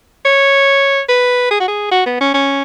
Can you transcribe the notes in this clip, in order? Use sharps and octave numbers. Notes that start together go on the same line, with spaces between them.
C#5
B4
G#4
F#4
G#4
F#4
B3
C#4
C#4